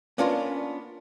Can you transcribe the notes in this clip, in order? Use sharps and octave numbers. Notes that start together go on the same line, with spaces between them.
A#3 B3 C#4 D4 F4 A#4